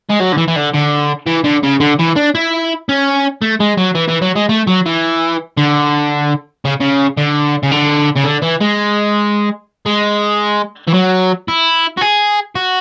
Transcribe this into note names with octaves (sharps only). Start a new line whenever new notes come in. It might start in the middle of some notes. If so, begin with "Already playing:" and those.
G#3
F#3
D3
E3
E3
D3
D3
E3
D3
C#3
D3
E3
D4
E4
C#4
A3
G#3
F#3
E3
E3
F#3
G#3
A3
F#3
E3
D3
C#3
C#3
D3
C#3
D3
C#3
D3
E3
G#3
G#3
E3
F#3
E4
F#4
G#4
F#4